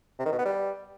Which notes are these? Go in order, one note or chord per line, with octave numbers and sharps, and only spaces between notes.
C3
D#3
B2
B3
G3